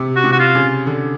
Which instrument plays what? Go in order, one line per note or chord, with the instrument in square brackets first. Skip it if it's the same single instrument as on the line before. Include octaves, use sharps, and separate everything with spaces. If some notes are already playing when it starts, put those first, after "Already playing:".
Already playing: [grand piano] C3
[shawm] F#4
[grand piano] C3
[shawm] F#4
F4
[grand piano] C#3
D3